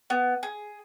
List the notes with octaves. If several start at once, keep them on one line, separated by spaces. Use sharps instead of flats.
B3
G#4